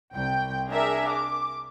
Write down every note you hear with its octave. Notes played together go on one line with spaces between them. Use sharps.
C2 G5
D4 G#4 A#4 E5
D6